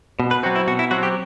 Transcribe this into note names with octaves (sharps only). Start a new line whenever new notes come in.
B2
B4
F#3 C4 F#4
E4
B2 F#4
E4
F#3 C4 F#4
G4